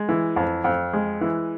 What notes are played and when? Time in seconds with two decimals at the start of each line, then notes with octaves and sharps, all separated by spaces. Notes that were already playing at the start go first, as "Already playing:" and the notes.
Already playing: G#3
0.09 E3
0.36 F2
0.64 F2
0.93 G#3
1.21 E3